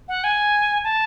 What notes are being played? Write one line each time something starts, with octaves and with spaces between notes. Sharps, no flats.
F#5
G#5
A5